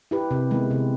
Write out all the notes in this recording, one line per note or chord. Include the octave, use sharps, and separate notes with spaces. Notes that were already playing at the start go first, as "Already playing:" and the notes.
E4 G4 B4
C3
D#3 G#3 B3 E4
C3